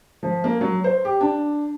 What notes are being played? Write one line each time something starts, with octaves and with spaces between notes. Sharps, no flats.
F3
A#3
F#3
C5
G4
D4